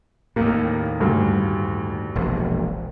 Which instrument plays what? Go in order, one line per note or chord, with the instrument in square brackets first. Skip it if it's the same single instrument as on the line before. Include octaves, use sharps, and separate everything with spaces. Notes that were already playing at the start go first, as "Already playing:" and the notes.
[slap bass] D#2 A2 [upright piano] A#3
[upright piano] D2 G2
[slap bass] E1 A#1